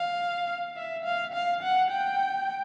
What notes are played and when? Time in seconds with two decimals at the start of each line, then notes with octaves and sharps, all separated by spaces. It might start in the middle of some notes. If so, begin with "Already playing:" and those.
Already playing: F5
0.77 E5
1.05 F5
1.34 F5
1.62 F#5
1.91 G5